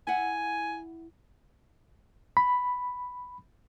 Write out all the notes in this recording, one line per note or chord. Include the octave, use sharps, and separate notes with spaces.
E4 F#5 G#5
B5